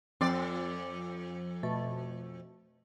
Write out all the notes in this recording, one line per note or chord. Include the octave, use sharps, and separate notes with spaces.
F2 C4 D5
B2 A3